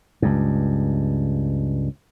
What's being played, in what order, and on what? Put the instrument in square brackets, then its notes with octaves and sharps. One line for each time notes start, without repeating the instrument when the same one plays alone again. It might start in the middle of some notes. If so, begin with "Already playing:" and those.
[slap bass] C#2 G2